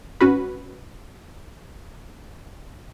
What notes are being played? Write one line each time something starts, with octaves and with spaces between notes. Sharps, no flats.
G#1 C#4 F#4 B4